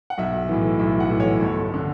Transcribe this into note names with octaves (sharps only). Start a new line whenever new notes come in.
F#5
B1 E5
A2 E3
B1 E5
F#5
A2 E3
C#5
G1 A4
D3